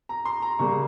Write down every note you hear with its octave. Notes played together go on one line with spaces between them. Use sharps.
A#5
C6
A#5
C#3 G3 A#3 C#6